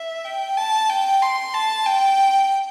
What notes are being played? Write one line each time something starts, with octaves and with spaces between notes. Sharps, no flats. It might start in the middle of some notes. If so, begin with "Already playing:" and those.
Already playing: E5
G5
A5
G5
C6
A5
G5